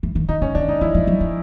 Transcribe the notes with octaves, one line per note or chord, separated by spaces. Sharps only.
E3
D#3
D3 D#4
C#3 C#4
D3 D4
D#3 D#4
E3 E4
F3
F#3
F3